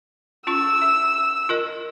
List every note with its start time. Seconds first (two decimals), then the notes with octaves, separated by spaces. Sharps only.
0.47 C#4 F4 C#6 E6
0.82 E5
1.49 F4 A#4 D#5